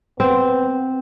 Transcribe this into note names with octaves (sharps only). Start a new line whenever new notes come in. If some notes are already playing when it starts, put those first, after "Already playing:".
B3 C4